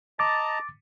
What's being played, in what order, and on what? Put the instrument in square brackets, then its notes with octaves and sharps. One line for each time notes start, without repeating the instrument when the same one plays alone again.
[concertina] D#5 A5 A#5 [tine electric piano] D6 A6